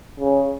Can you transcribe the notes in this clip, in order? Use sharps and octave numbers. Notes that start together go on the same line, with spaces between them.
C#3